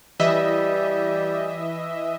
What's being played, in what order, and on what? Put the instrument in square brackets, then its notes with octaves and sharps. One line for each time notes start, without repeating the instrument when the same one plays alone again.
[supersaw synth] E3 D#5 E5 [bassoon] G3